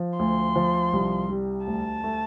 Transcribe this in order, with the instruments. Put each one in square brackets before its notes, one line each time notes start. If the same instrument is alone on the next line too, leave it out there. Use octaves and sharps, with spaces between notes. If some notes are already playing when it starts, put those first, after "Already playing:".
Already playing: [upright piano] F3
[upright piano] D2 [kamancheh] C6
[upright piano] F3
C2
G3
[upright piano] D2 [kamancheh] A5
[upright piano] A3